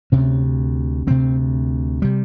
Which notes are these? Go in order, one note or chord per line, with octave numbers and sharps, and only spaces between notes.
D2 C3 C#4
D2 C3 C4
C3 G3